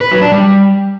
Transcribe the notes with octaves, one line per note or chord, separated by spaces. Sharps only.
B4
F#3
D4
G3